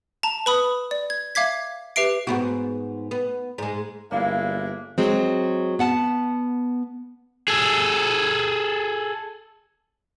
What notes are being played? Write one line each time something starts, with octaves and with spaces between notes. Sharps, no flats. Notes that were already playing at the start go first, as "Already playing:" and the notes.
A5 A#5
B4 B5 D#6
D5
G#6
E5 F5 D6 G#6 B6
G4 B4 E5 C7 D7
G#2 B3 F#4
B3
G#2 G#3
G1 G#3 A#3 D4 E4 F5
F#3 G#3 C4
B3 F#5 A5
G#4 A4